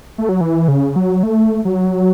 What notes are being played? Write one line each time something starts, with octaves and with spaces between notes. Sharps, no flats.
A3
F#3
E3
C#3
F#3
A3
F#3